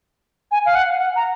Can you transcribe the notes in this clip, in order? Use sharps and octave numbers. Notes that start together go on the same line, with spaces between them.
G#5
F5
F#5
F#5
A#5